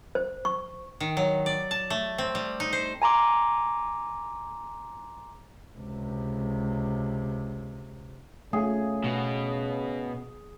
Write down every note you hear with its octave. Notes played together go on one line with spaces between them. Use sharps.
C5
C#6
D#3
F#3
D5
A5
A3
C4
G3
D#4
C5
G#5 A#5 C6 D6
C#2 C3
C#3 A3 G#4
B2